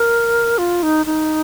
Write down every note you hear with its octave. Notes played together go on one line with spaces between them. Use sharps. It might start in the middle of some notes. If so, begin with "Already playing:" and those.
Already playing: A#4
F4
D#4
D#4